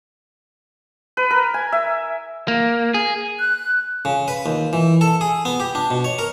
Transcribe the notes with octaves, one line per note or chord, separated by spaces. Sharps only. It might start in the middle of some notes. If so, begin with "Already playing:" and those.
B4
A#4
G#5
E5
A#3
G#4
F#6
C#3
B4
D#2
E3
A4
G#4
B3
G4
D4
B2
C#5
A#4